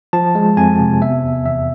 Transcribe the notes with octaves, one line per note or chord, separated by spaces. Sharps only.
F3 A5
G#3
F2 G#5
C3
B3 E5
E2
E2 E5